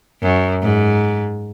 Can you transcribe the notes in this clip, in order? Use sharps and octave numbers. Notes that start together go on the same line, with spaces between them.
F#2
G#2